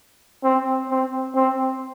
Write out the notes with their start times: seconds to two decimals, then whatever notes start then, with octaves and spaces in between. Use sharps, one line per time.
0.44 C4
0.89 C4
1.35 C4